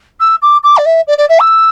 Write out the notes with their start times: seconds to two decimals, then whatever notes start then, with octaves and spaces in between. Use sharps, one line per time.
0.20 E6
0.42 D6
0.63 D6
0.77 D5
0.85 E5
1.07 D5
1.18 D5
1.29 E5
1.40 E6